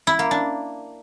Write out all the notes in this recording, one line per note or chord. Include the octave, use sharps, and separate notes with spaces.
E4
A#3
D4